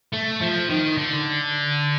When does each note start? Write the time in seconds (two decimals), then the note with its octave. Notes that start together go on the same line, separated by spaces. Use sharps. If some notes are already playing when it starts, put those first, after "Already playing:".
0.13 A3
0.42 F3
0.70 D#3
0.97 D3